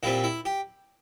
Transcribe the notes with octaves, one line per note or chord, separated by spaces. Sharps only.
A#2 G3 C4 E4
E4
G4